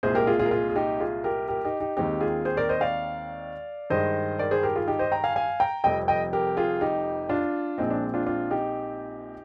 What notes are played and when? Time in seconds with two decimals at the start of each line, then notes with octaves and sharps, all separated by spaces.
0.03 C2 A#2 G#3 G#4 C5
0.15 G4 A#4
0.27 F4 G#4
0.39 F4 G#4
0.46 A#4
0.51 F4 G#4
0.69 G#4
0.76 D#4 G4
1.00 F4 G#4
1.24 G4 A#4
1.48 G4 A#4
1.65 D#4 G4
1.80 D#4 G4
1.97 D#2 D#3 G#3 C4 D#4 G4
2.21 F4 G#4
2.45 G#4 C5
2.57 A#4 D5
2.69 C5 D#5
2.81 D5 F5
3.90 G2 D#3 G#3 C5 D#5
4.39 A#4 D5
4.51 G#4 C5
4.63 G4 A#4
4.76 F4 G#4
4.87 D#4 G4
4.99 C5 D#5
5.12 G5 A#5
5.24 F5 G#5
5.36 F5 G#5
5.60 G5 A#5
5.84 F1 F2 C3 G3 C4 D#5 G5
6.08 D#5 G5
6.33 G4 A#4
6.57 F4 G#4
6.81 D#4 G4
7.29 D4 F4
7.78 A#1 A#2 G#3 C4 D#4
7.90 D4
8.14 D4 F4
8.26 D4 F4
8.51 D#4 G4